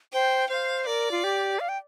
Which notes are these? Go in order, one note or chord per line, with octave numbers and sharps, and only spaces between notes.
C5 G5
C5 F5
A#4 D5
F4
G4
F5
G5